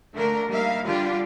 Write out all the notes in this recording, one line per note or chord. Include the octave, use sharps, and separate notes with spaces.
D3 A3 A#3 D4 A#4
G3 A#3 D#4 E5 F5
D3 G3 D4 F4 G4